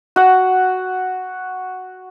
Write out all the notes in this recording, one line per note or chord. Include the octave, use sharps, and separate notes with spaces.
F#4 F#5